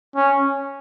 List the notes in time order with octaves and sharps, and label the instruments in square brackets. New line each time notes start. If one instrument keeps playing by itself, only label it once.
[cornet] C#4